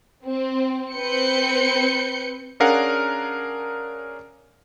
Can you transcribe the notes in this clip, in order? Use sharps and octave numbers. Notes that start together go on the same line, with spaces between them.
C4
C4 B4 G6 C#7
C#4 D4 G#4 A#4 F5 F#5